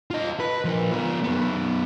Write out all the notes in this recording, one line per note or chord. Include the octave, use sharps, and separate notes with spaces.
F4 D#5
B4
F3 A#4
B3 F4
F#2 B3